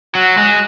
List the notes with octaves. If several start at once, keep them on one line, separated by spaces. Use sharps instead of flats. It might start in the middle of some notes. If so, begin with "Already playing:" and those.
F#3 F#4
G#3